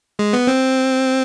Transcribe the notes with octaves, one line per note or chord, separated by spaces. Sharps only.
G#3
B3
C4